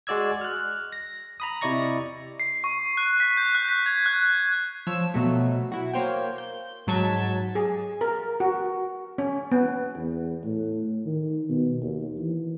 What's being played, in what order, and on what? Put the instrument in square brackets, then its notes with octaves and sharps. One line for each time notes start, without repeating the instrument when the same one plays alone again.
[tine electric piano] G#3 F#4 D5 E6 G#6
F6 F#6
A#6
A#5 B5 D#6
C3 E4 D5 D#5 C#6 A#6
[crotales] C7
C#6
F#6
B6
G6
F#6
B6
G#6
F#6
[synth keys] F3 C#5 E6
B2 F#3 A3
E4 F#4
A#3 C5 C#5 G5
G6
G#2 F#3 A5 G#6 B6
[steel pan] G#4
A#4
F#4
C#4
B3
[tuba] E2
A2
D#3
B2
D#2
E3